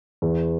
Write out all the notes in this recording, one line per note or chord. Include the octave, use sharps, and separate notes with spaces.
E2